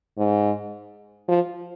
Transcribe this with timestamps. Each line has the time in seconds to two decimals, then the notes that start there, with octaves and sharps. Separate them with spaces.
0.18 G#2
1.28 F3